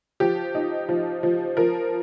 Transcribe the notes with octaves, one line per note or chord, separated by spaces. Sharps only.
F3 G4
D#4
F3
F3
F3 A#4